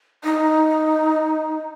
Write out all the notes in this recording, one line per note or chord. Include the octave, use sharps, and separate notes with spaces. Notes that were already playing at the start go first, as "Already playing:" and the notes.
D#4